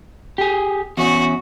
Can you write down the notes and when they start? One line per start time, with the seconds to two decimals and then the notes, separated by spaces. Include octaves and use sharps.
0.38 G4 G#4
0.97 E2 C#4 F#4